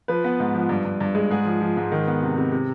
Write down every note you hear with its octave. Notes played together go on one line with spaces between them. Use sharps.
F3 B4
B3
G#2
F3
G2
G2
G2
G#3
G#2 G#4
F3
F3
G#2
D#3
B3
C3
C3
C3